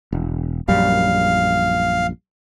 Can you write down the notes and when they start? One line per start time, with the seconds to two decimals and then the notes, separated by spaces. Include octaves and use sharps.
0.12 E1
0.68 A#1 F#2 G3 F5